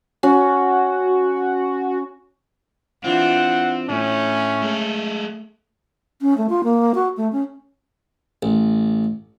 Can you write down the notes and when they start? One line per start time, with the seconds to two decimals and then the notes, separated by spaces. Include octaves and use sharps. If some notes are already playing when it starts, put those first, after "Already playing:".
0.23 C#4 F#4
3.04 E3 C4 D4 F4 F#5
3.89 A2 A3 C#4
4.62 G#3 A4
6.22 C#4
6.38 A3
6.49 F4
6.64 A#3
6.95 F#4
7.17 A3
7.32 C#4
8.43 A1